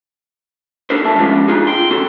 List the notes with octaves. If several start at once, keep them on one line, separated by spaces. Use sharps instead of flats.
D4 D#4 G4 A4 A#4 C5
G2 A3 E5 A5
F3 G#3 B3 C#4 F4 G4
D4 D#4 F4 G#4
G5 C6
C#3 C4 F#4 A4